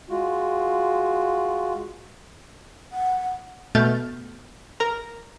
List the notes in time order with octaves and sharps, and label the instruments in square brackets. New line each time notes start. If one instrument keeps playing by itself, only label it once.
[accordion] G#3 F4 F#4
[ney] F#5
[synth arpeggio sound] B2 A3 F6 G6 A6
A#4 A#5